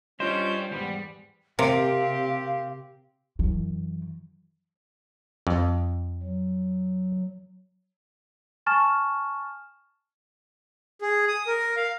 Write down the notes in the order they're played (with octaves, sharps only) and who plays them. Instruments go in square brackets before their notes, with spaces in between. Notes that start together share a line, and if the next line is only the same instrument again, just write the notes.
[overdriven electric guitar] G3 D4 [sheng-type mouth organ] C#4 C#5 G6 [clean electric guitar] F4 D#5 [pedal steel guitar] C5
[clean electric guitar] E2 G#2 [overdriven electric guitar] G3 [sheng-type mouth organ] B3
[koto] C3 [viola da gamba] C4 G4 [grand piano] A#4 D7 [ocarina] F5
[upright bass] F#2 E3
[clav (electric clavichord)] F2
[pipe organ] F#3
[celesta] G#5 A5 C#6 F6 A6 E7
[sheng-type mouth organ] G#4
D#6
A#4
F5